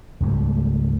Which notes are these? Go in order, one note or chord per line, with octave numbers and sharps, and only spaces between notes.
C#2 G#2 G3 A3